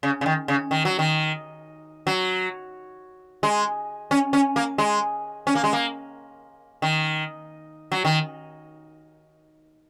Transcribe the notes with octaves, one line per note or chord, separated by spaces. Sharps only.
C#3
C#3
D#3
C#3
D#3
F#3
D#3
F#3
G#3
C#4
C#4
A#3
G#3
C#4
A#3
G#3
A#3
D#3
F#3
D#3